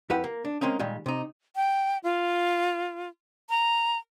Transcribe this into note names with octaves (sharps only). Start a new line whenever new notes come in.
F2 E4 G4 B4 F#5
A#3
D4
G#3 A#3 C4 C#4 D#4
A#2 D#3 G3 G#3
C3 D#4
G5
F4
A#5